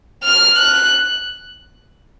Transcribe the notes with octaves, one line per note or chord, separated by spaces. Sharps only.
F6
F#6